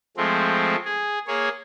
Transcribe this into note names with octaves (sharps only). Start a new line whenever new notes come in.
F3 G#3 A3 C4
G#4
A#3 G#4 C#5